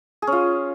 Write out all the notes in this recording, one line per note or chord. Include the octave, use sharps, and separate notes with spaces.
G#4
C#4
F4